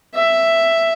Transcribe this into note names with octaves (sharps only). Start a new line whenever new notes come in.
E5